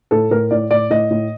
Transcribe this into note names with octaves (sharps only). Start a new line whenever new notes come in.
A2 A4
A2 A#4
A2 D5
A2 D5
A2 D#5
A2